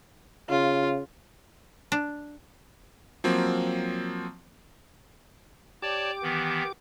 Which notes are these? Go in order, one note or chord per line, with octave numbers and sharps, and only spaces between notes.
C#3 F4
D4
F3 F#3 A#3 C4
G4 C#5 D5 A5 D6
D#3 E3 B3